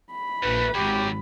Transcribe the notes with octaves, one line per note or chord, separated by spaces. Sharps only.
B5
A#1 G2 A3 B4
G#1 F#2 F#3 G4